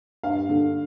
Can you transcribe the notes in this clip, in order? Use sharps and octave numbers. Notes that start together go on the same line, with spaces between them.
G2 F5
D3